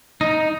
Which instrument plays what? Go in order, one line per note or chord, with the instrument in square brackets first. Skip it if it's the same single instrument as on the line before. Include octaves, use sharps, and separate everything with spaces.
[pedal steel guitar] D#4